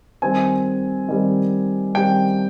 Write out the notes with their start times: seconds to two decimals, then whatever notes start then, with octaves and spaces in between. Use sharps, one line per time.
0.22 D#3 G3 C4 G#5
1.09 D#3 G3 C4
1.94 D#3 G3 C4 G5